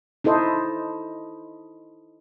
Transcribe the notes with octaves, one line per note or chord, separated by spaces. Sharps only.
D#4 E4 A4 C5 D#5